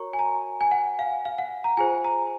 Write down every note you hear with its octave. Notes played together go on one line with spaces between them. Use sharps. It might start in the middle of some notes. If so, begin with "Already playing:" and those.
Already playing: F#4 A#4 C#5 A#5 C#6
G#5
A#5
G#5
F#5
F5
F5
F#5
A#5
F4 G#4 C5 G#5
A#5